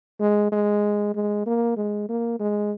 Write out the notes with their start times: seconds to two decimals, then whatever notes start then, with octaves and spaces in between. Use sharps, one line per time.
0.20 G#3
0.52 G#3
1.14 G#3
1.46 A#3
1.76 G#3
2.09 A#3
2.39 G#3